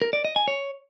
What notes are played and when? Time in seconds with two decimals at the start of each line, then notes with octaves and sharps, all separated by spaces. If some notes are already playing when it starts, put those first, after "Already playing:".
0.02 A#4
0.13 D5
0.25 D#5
0.36 G#5
0.48 C#5